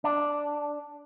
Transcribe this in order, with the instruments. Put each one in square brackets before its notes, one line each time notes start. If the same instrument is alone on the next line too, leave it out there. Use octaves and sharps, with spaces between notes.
[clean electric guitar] D4